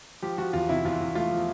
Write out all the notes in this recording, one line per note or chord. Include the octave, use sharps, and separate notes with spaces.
F3 G4
F3 F#4
E2 F4
C3 E4
E2 F4
E2
A3 F4
F3